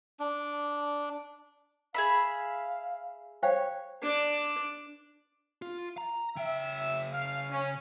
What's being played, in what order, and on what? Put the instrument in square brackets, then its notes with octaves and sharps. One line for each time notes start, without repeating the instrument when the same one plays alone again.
[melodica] D4
[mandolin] G#4 E5 B5 [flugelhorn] F5
[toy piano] C5 F5 G5 [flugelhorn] C#5
[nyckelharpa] D4 D5
[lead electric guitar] F4
A#5
[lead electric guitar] C#3 G5 [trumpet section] E5
[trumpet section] F5
C#4